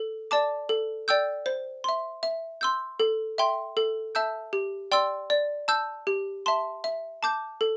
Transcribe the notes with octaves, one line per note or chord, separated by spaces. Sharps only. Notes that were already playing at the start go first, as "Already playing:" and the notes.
Already playing: A4
D5 A5 D6
A4
D5 G5 E6 G6
C5
E5 C6
E5
C6 E6 G6
A4
E5 G5 C6
A4
E5 A5 E6 G6
G4
D5 G5 C6 E6
D5
A5 E6 G6
G4
E5 A5 C6
E5
A5 D6 G6
A4